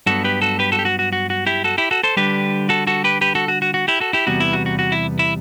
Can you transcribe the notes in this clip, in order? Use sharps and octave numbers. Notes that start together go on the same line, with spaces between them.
G2 F#3 B3 F#4 A4
G4 B4
F#4 A4
G4 B4
F#4 A4
G4
F#4
F#4
F#4
F#4
E4 G4
F#4 A4
E4 G4
F#4 A4
A4 C5
D3 G3 D4 G4 B4
F#4 A4
F#4 A4
G4 B4
G4 B4
F#4 A4
F#4
F#4
F#4
E4 G4
F#4 A4
E4 G4
E2 C3 G3 B3 F#4
E4
F#4
F#4
F#4
E4
E4